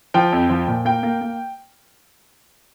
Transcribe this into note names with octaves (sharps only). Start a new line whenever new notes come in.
F3 G5
F2
F3
A#2
A#3 G5
A#3
A#3